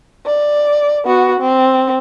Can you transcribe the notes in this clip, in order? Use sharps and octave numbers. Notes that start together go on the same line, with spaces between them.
D5
B3 F#4
C4